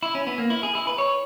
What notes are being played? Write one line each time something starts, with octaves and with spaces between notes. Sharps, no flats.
E4
C#4
B3
A#3
E4
G#4
E4
B4
C#5